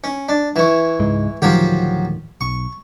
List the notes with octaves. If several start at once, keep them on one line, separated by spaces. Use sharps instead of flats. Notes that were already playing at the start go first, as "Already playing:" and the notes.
C#4
D4
E3 C#5
C#2 G#2 G#3
D2 A2 D#3 F3 F#3 G4
B1 C#6